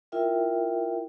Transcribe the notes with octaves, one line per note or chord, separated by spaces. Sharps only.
E4 F4 A#4 E5 G5